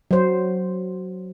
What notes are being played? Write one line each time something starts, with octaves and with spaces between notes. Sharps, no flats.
F#3 C5